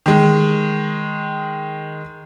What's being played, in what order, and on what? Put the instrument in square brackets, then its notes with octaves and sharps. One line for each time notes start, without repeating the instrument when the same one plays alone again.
[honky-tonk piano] D#3 G#3